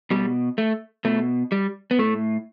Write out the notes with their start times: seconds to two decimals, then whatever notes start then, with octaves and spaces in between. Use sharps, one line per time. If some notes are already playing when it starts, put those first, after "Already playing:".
0.11 B2 G3
0.58 A3
1.05 B2 A3
1.52 G3
1.91 B3
1.99 A2 A3